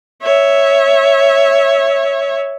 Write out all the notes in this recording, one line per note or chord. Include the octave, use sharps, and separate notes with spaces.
C#5 E5